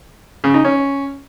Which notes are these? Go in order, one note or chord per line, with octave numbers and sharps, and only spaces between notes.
C#3
D#4
C#4